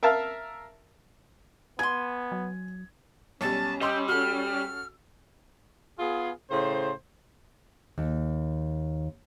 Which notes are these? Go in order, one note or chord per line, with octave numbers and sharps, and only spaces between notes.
A#4 E5 F5 A5
B3 G#5 C6 G#6
F#3
B1 G3 C#4 A5
G3 G4 D#5 C6 E6
F#4 A4 F6
B3 F4 G#4
A2 C#3 C5
D#2